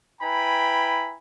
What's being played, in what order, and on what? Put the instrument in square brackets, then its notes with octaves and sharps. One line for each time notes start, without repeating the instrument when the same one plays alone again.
[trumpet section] E4 B4 G5 G#5 A#5 B5